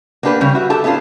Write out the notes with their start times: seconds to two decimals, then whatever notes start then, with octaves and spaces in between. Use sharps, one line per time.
0.23 A#3 B3 D4 G4 B4
0.41 C#3 G3 C#4
0.55 F#4 E5
0.70 G4 A4 A5
0.84 A3 B3 C#4 D4 F4